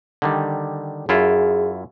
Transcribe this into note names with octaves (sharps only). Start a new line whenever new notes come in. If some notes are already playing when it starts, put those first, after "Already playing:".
D3 D#3 G3
F#2 E4 F4 G#4